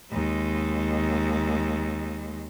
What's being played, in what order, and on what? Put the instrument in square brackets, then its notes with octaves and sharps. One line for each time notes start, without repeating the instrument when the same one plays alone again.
[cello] D#2 G#3